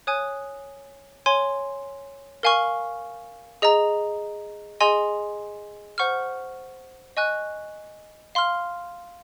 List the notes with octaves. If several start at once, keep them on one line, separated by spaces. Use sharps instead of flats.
C#5 G#5 D#6 F#6
C#5 G#5 C6
A#4 F5 G#5 C#6 F6
G#4 D#5 A#5
G#4 D#5 G#5 C6
C5 F#5 C#6 F6
D#5 G#5 C#6 F#6
F5 C6 F6